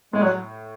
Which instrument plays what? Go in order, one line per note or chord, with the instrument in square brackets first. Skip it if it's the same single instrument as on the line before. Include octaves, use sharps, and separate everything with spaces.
[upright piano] A2 [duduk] G#3
[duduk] F#3